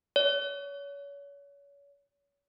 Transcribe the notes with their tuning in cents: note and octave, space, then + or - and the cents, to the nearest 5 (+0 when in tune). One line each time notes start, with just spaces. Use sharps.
C#5 +30